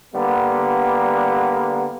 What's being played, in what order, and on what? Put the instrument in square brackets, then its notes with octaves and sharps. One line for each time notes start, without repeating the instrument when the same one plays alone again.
[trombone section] D3 G3 A#3 B3